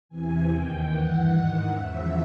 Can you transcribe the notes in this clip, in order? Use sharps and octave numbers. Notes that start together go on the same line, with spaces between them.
E2 C3 E3 G#5
D#2 D#3 G5
G2 E3 F#5
G#2 D#3
E2 C#3 F3 E5